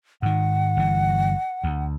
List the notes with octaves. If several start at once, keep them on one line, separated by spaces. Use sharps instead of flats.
G#2 D#3 F#5
G1 E3
D2